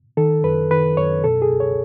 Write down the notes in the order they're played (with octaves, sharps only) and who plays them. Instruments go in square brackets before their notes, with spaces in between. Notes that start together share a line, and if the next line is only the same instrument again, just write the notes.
[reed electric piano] D#3 A4
F#2 B4
D#3 B4
F#2 C#5
B2 A4
G#4
C#2
C#5